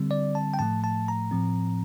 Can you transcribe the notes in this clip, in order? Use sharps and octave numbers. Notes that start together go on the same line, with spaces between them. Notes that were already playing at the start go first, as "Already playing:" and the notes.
Already playing: D3 G3 C4
D5
A5
G5
A2 F3 A3 A5
A5
A#5
A2 F3 C4